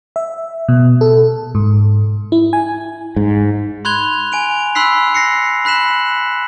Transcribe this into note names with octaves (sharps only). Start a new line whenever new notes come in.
E5
B2
A4
G#2
E4
G#5
G#2
B5 C6 F#6 G#6 F7 G7
G#5 D7 F7
B5 C6 E6 F#6 B6 C7
A#6 C7 C#7
B5 F#6 B6 E7 F#7